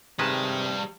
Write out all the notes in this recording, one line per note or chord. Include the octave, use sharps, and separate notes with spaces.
C3 D#3 G3 G#3 B4 A5